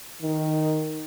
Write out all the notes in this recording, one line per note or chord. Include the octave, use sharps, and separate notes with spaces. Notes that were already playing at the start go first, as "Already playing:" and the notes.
D#3